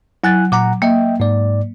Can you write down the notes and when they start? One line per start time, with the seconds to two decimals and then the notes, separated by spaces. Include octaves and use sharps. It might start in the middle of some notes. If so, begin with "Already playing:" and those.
0.24 F#3 E4 G#5 F#6 A6
0.52 A#2 F#5 A#5 D6
0.82 A#3 D#5 E5 G5
1.20 G#2 D5